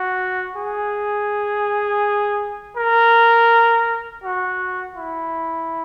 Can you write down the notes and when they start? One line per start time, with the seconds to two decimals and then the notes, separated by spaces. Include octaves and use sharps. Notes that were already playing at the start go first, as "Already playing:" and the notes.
Already playing: F#4
0.56 G#4
2.77 A#4
4.24 F#4
4.97 E4